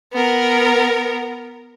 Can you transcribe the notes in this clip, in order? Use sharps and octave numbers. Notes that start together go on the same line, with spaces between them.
B3 A#4